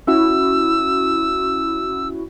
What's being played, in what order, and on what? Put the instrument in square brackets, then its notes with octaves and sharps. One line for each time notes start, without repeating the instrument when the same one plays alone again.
[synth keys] C#4 E4 F#4 [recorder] E6